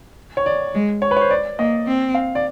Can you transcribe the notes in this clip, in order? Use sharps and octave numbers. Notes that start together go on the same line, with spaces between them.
C#5
D5
G#3
C#5
B4
C#5
C5
D5
A#3 D#5
C4
F5
D5